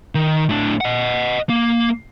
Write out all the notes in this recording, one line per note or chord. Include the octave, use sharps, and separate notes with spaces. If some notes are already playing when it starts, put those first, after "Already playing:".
D#3
A2 D4
D#5 F#5
A#3